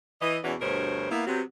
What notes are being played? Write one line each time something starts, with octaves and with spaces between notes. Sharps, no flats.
E3 D#5
E2 B2 E3 C#4 F#4 D5
D2 G2 B2 A#4 C5 C#5
A#3 B3 E4
C3 F#3 B3